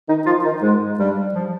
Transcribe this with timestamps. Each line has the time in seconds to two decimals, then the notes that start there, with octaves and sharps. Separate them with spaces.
0.08 D#3 D#4
0.26 F3 F4
0.44 D#3 D#4
0.62 G#2 G#3
0.99 G2 G3
1.35 F3